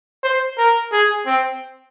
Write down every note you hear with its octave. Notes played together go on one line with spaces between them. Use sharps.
C5
A#4
G#4
C4